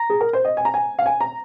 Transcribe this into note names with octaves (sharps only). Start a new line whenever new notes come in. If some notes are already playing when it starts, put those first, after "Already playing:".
Already playing: A#5
G#4
A#4
C5
D#5
G#5
A#5
G#5
F5
G#5
A#5